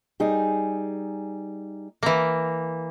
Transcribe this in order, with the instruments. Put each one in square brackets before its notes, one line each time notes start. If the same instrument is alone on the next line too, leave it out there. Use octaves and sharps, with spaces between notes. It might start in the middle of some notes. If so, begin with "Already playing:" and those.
[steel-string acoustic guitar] G3 D#4 G#4
[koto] E3 A#3